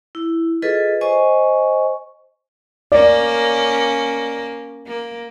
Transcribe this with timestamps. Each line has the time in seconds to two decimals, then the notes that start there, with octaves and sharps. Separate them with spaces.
0.15 E4
0.62 F4 G#4 A4 B4 D#5
1.01 C5 D#5 G#5 C#6
2.92 A#3 C#4 D5
4.86 A#3